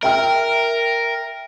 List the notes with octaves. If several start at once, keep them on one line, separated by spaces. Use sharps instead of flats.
A#4 E5 G5 F6